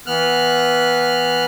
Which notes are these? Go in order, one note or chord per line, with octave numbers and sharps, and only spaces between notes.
E3 B3 F6 F#6